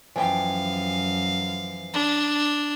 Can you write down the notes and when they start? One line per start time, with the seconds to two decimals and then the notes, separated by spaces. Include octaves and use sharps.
0.16 F#2 E3 F3 F5 G5
1.93 D4